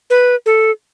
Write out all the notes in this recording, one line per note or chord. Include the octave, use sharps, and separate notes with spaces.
B4
A4